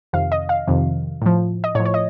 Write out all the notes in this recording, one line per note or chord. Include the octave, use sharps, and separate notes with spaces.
F2 C3 D#3 F5
D#5
F5
F2 C3 D#3
A2 F3
D#5
A2 F3 C#5
C#5
D#5